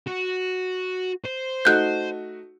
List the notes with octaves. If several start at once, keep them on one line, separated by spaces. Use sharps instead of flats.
F#4
C5
A3 D#4 F#4 F#6 G6